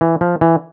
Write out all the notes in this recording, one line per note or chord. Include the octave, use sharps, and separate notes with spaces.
E3
F3
E3